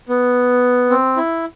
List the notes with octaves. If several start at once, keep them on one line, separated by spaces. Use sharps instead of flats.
B3
C4
E4